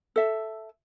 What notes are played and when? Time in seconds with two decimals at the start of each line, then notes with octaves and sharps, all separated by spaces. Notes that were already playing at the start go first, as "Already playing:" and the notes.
0.16 A4 E5